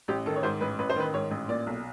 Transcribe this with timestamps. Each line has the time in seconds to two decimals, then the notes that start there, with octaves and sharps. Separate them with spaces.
0.08 A1 G4
0.26 D#3 A4
0.36 C#5
0.43 G#2 C5
0.61 A1 B4
0.79 A1 B4
0.90 C5
0.96 D#3 B4
1.14 G#2 C#5
1.31 A1
1.49 A#2 D5
1.67 B1